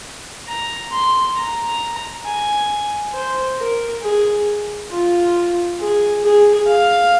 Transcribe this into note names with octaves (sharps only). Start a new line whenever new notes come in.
A#5
C6
A#5
G#5
C5
A#4
G#4
F4
G#4
G#4
F5